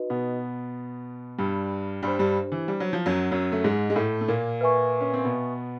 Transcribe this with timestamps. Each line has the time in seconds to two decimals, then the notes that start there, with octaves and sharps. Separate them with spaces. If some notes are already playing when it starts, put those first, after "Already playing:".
Already playing: D#4 F#4 B4 D#5
0.10 B2 B3
1.38 G2 G3
2.03 G2 G3 D4 G4 C5
2.19 G2 G3
2.52 E3
2.68 G3
2.80 F#3
2.93 F3
3.06 F#2 F#3
3.31 F#2 F#3
3.52 A3
3.64 G#2 G#3
3.90 G#3
3.96 A2 A3
4.21 A3
4.28 A#2 A#3
4.61 B4 E5 G#5 C#6
5.00 C#4
5.14 C4
5.24 B2 B3